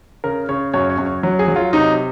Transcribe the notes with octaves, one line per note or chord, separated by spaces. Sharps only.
C#3 A#4
C#3 C#5
F#2 C#5
C#5
F#2
C#5
F#3
G#4
F#3
F4
C3 D#4